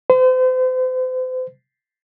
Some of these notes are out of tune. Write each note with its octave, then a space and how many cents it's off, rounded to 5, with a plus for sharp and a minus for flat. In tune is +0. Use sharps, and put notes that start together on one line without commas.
C5 -40